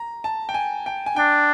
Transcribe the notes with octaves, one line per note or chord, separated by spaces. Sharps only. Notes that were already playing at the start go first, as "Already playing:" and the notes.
Already playing: A#5
A5
G5
G#5
G5
G#5
D4 G5